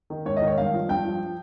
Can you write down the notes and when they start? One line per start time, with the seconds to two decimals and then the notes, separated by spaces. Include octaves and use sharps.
0.10 D#3
0.25 G#2 C#5
0.37 D#5
0.42 D#3
0.47 C#5
0.58 G2 F5
0.74 F3
0.89 G2 G5
1.05 F3